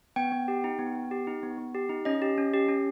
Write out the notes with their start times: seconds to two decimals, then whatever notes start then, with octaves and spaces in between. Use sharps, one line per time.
0.16 B3 G5
0.32 B3
0.48 G4
0.64 D#4
0.79 B3
0.95 B3
1.11 G4
1.27 D#4
1.43 B3
1.58 B3
1.75 G4
1.89 D#4
2.05 C#4 D#5
2.22 G4
2.38 C#4
2.53 G4
2.69 C#4